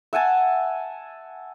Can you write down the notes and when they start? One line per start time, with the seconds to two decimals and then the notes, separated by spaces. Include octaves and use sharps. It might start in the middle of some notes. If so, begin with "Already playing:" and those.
0.13 E5 F#5 G#5 A5